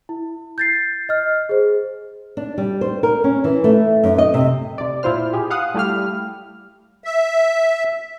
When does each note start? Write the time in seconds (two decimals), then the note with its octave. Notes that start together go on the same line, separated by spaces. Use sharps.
0.09 E4
0.58 G6 A6 C7
1.09 D#5 F6
1.49 G#4 C5
2.37 D4
2.58 G3
2.81 C5
3.03 A#4
3.24 C#4
3.44 E3
3.64 A3
4.04 F#2
4.18 D#5
4.34 C3
4.78 C3 D5
5.03 A#2 E4 F4 C5 F6
5.33 G4 G#4
5.51 F5 F#5 D#6
5.74 G3 A3 E4 G4 F5 F6
7.04 E5